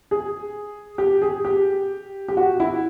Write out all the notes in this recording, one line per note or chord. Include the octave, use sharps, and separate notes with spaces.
G#4
G4
G#4
G4
G4
F#4
E4